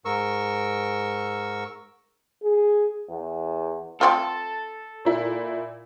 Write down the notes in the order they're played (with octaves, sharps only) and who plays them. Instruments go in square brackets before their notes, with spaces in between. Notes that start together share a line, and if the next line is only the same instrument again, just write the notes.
[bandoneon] G#2 A#4 C#6 E6
[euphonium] G#4
E2
[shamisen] A3 C4 F4 [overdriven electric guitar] A4
[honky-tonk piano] A#2 E4